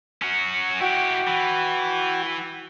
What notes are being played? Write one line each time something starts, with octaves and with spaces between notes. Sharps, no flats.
C#4 F#4
E4 F#4 G4 G5
E3